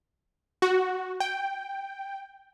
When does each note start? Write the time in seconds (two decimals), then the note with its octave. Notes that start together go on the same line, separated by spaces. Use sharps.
0.62 F#4
1.20 G5